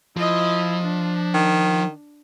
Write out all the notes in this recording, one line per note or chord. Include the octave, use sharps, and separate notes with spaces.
F3 E4 D#5
D4
D#3